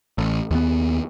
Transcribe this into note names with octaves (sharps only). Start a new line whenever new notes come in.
A1
D#2 B3